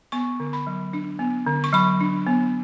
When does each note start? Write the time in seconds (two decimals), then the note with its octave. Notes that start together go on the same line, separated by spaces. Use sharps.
0.12 B3 C#6
0.40 D3
0.53 B5
0.67 F#3
0.93 D4
1.19 B3
1.47 D3
1.64 C#6
1.73 F#3 B5
2.01 D4
2.27 B3